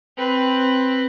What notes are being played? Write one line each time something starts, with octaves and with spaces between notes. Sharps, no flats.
C4 B4